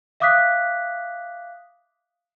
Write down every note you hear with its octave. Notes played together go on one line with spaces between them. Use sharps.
E5 F5 D6 D#6 F#6 B6